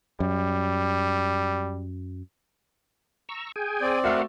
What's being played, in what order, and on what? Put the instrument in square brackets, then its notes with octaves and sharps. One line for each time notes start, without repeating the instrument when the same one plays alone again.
[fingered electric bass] F#2 [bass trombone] G3
[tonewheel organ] A#5 C#6 E6
G#4 G5 G#5
[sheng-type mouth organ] C4 D5
[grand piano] A3 F#4 [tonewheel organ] A#4 F5 F#5